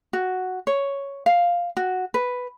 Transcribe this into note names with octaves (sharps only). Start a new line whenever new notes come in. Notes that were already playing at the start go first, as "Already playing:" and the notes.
F#4
C#5
F5
F#4
B4